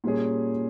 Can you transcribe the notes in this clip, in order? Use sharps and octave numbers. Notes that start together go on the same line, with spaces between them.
A#2 G3 C#4 G#4